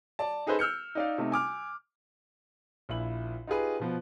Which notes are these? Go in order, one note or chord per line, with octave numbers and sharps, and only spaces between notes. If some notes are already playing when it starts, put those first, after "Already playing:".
D5 A5
D#4 G#4 A4 B4 C5 D#5
E6 F6 G6 C#7
D#4 D5 F5
C3 A3 D#4
G#5 D6 F6
A#1 A#2 E4 E5 F#7
D#4 F4 G4 G#4 B4
B2 F3 B3